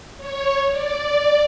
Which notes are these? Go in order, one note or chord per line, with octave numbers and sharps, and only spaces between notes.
C#5
D5